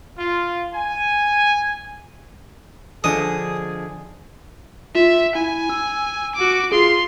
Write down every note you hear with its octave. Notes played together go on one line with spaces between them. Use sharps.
F4
G#5
D3 F3 G#4 D#5 G#5 D#6
F4 E5
E4 G#5
E6
F#4 D6
F4 G#4 C6